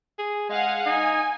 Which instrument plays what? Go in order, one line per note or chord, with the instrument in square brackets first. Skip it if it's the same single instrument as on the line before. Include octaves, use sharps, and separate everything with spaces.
[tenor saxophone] G#4
[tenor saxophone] G#3 [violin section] F5 F#5 G#5
[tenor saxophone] D#4 [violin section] G#5